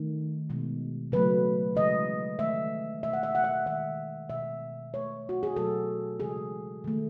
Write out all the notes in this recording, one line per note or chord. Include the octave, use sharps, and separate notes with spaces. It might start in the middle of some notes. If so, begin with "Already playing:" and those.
Already playing: D#3 A3
B2 G#3
C#3 F#3 A3 B4
C#3 E3 G#3 D#5
D#3 A3 E5
B2 A3 E5
F#5
E5
F#5
E5
D#3 G#3 E5
B2 G#3 E5
B2 A3 C#5
F#4
G#4
B2 F#3 A3 A4
C#3 E3 G#3 G#4
D#3 A3